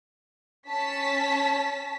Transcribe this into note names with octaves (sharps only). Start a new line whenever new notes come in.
C#4 A5 B6